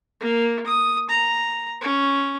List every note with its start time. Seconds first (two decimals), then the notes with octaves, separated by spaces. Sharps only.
0.20 A#3
0.66 D#6
1.09 A#5
1.81 C#4